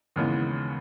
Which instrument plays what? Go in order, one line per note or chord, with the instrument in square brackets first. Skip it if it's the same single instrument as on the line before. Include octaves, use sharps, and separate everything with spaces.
[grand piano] D#2 C#3 E3 G#3 B3